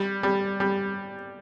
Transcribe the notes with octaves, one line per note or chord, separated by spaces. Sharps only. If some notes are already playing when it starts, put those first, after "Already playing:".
Already playing: G3
G3
G3